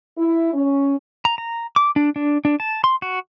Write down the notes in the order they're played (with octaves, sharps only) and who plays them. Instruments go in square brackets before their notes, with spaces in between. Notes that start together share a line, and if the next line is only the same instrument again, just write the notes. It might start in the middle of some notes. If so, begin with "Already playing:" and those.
[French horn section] E4
C#4
[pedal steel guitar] A#5
A#5
D6
D4
D4
D4
A5
C6
F#4